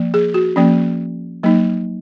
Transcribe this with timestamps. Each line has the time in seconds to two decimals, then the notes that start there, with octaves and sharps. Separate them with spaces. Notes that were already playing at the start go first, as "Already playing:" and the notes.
Already playing: F3 A#3
0.14 G#4
0.34 F#4
0.56 F3 A#3 C#4
1.43 F#3 A#3 D#4